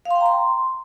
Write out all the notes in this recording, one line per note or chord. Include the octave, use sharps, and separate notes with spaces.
F5
C6
G5
A#5
C6